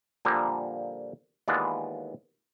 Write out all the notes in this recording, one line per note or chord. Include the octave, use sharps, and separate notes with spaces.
A#2 D3 F3 G3 A#3
D#2 E3 G#3 B3 F4 D5